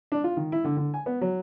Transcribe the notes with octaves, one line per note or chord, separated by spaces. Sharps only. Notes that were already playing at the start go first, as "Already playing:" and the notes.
D4
F4
D#3
E4
D3
D3
G#5
B3
F#3